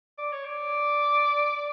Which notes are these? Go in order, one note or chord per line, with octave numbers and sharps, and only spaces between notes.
D5
C#5
D5